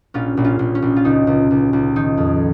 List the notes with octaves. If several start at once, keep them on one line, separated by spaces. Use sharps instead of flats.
A#1 C#4 F4
A#1
C#4 F4
A#1
C#4
A#1
F4
C#2 D#4
C#2
C#2
C#2
D#3 D#4
F2